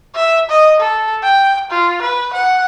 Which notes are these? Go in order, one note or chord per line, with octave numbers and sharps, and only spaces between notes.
E5
D#5
A4
G5
F4
B4
F#5